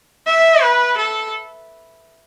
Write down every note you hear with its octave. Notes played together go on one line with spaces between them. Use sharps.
E5
B4
A4